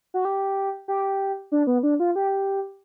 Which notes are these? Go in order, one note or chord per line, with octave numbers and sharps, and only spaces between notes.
F#4
G4
G4
D4
B3
D4
F4
G4